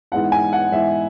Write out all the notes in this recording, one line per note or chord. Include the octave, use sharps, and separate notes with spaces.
G#2 E3 G#3 B3 E4 F#5
G#5
F#5
G#2 E3 G#3 B3 E4 E5